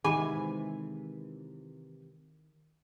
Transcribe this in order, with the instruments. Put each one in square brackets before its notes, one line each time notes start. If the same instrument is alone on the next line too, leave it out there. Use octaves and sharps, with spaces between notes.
[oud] C3 E3 G#3 [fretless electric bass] D#3 [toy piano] G4 B5 D6 [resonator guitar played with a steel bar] G#5